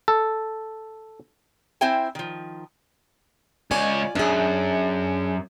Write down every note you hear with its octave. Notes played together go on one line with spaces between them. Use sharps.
A4
C4 E4 C5 E5 G5 G#5
D#3 F3
C#2 F4 C#5 D5 G#5
F#2 D4 G#4